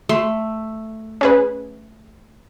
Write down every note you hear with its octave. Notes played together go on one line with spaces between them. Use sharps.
A3 C6
C#4 G#4 B4